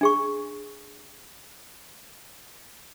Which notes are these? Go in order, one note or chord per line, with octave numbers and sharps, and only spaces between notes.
D4 G#4 C#6